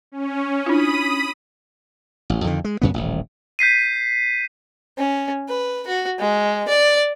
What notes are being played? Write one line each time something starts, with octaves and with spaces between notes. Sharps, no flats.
C#4
D4 E4 F4 B5 D#6 D#7
A1
F2 D3 D#3
G#3
F#2 C#3 B3
D#1 A1
G6 B6 C7 D#7
C#4
B4
F#4
G#3
D5